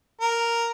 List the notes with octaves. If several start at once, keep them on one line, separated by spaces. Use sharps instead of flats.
A#4